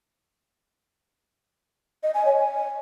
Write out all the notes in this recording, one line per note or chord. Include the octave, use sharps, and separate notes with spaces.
D#5
G#5
C#5
G#5